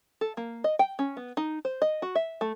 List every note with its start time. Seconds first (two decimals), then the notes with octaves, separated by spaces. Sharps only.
0.21 A4
0.37 A#3
0.64 D#5
0.79 G5
0.99 C#4
1.17 B3
1.37 D#4
1.65 C5
1.82 D#5
2.02 F#4
2.15 E5
2.41 A3